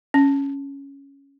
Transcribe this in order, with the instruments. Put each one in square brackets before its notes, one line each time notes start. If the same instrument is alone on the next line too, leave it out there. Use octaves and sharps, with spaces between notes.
[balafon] C#4